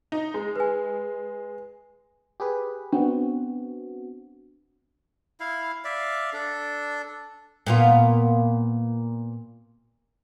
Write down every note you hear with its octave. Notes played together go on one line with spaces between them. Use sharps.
D#4
G#3
B4 G#5
G4 G#4 B4
B3 C4 D4 F#4
E4 F5
D5 E5 F5
D4 A4
A#2 B3 F4